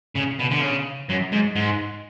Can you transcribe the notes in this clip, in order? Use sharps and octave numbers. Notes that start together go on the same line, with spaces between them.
C#3
B2
D3
C#3
F#2
G#2
G#2